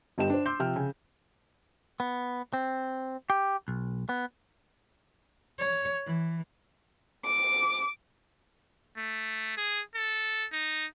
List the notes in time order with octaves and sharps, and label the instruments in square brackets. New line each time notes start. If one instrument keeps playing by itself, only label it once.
[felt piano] G1 G2 G3 D#5 G5 E7
D4 C5
C6 D6 E6 G6
C3 F3 G5 F6
C#3 G#5
[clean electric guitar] B3
C4
G4
B1
B3
[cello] C#5
E3
[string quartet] D6
[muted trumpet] A3
G#4
A4
D#4